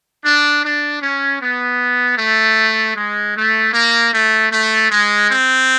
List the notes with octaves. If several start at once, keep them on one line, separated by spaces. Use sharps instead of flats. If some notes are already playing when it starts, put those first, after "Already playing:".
D4
D4
C#4
B3
A3
G#3
A3
A#3
A3
A3
G#3
C4